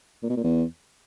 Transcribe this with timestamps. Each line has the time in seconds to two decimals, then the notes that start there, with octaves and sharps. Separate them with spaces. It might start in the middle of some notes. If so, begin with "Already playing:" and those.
0.22 A#2
0.29 B2
0.36 A#2
0.44 E2